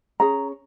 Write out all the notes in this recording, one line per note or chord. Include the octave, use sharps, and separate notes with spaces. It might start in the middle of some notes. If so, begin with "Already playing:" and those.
C#4 G#4 A#5